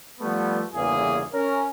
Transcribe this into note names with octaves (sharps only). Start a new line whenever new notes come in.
F3 G3 A3 B3
G1 E2 C#3 E3 A#3 G#4
C#4 A#4